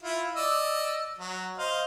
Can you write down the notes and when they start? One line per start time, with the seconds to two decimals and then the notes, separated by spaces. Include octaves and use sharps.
0.03 E4 F4
0.36 D5 D#5 E6
1.18 F#3
1.58 C5 D#5 F5